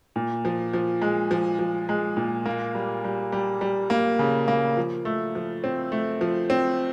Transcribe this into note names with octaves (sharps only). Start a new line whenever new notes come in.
A#2
F3
F3
G#3
F3
F3
G#3
A#2
A#3
G3
G3
G3
G3
A#3
C#3
A#3
F3
A3
F3
C4
A3
F3
C4